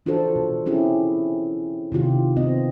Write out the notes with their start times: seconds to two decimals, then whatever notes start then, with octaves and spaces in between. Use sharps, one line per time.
0.06 E3 D4 F4 F#4 A4 C5
0.36 B2
0.66 C4 C#4 E4 G4 G#4
1.92 C3 D#3 F4 G4
2.37 B3 C4 D#5